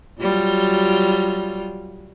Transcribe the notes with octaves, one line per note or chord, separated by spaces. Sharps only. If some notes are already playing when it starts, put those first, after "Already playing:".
F#3 G3 F4